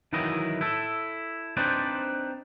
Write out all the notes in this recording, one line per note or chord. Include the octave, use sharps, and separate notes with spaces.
D#3 E3 F#3 E4 D#5
E4 A4
C4 D4 D#4 B4 C5 D5